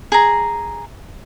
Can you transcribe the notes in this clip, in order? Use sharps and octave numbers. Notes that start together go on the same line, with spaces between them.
G#4 A#5